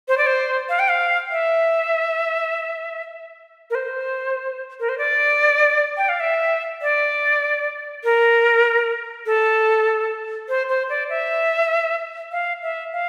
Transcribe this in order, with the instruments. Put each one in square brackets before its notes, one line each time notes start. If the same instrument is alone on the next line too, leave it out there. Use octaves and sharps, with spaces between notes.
[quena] C5
D5
C5
F5
G5
F5
E5
A#4
C5
A#4
C5
D5
G5
F5
E5
D5
A#4
A4
C5
C5
D5
E5
F5
E5
F5